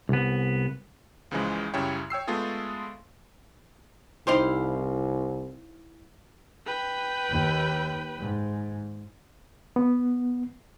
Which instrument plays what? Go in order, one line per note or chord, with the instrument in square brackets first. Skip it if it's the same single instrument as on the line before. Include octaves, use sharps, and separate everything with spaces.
[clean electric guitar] C2 B3
[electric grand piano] C#2 C#3 E3 F3 G#3
F#2 C#3 G3 E4 C#5 G5
C#5 G5 E6 C7
G#3 A3 B3 F4 G#4 A4
[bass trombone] C2 [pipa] D#4 G4 C5 [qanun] E4 F5
[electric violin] B4 G5
[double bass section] D#2
G#2
[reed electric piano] B3